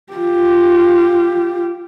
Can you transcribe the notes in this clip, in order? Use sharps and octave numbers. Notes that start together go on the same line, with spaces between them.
F4 G4